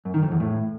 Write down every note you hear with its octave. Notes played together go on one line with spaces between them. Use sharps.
F#2
D#3
F2
E2
A2